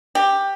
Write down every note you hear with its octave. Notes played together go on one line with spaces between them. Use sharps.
G4